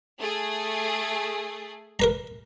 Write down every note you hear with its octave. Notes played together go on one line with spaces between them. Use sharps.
A3 G#4
A#4 B4 A#5